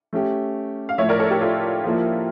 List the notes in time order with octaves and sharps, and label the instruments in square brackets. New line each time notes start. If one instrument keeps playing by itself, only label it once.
[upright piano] A3 C#4 G4
[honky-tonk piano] F5
[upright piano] A2 F3 A3 [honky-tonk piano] C#5 E5
[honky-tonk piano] A#4 D5
A4 C#5
G4 A#4
F4 A4
[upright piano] F3 A#3 E4